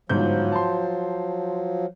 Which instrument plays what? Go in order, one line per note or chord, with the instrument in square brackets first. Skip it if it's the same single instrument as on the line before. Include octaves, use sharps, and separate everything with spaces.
[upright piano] G1 G#2 G6 [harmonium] F3 F#3
[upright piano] A5 C6